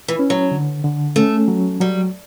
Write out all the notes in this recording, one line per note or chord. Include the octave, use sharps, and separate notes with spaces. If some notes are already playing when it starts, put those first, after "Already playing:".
E3
C#4
F#3
D3
D3
A3 C#4
F#3
F#3 G3